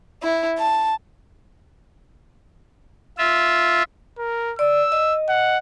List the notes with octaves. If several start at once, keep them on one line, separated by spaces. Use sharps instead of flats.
E4
A5
F4 E5
A#4
D5 E6
D#5
F#5